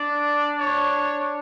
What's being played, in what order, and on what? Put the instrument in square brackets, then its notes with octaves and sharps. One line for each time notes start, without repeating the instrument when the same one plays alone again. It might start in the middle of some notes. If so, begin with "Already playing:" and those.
Already playing: [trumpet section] D4 [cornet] D5
[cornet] C#5